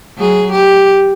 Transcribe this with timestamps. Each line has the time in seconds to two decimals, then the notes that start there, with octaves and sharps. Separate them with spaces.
0.17 F#3 G#4
0.51 G4